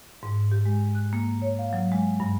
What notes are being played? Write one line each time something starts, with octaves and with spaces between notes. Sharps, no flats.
G#2
G4
G#3
F#6
A#3
C#5
F5
F#3
G#3
G2